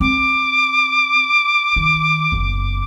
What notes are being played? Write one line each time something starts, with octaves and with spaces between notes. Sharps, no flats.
C4 D6
D#3
F#1 B3